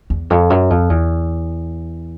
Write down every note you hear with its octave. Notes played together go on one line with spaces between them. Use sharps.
E2
F2
F#2
F2
E2